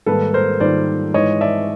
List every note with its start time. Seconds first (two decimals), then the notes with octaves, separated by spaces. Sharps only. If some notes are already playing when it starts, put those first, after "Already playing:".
0.06 G#2 D#3 G3 A#3 A4 B4
0.34 A#4 C5
0.60 G#2 D#3 G3 A#3 C5 D5
1.14 G#2 E3 G#3 C#5 D#5
1.41 D5 E5